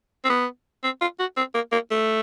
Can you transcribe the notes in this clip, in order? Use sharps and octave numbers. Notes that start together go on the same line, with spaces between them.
C4
B3
C4
F4
F#4
C4
A#3
A#3
A3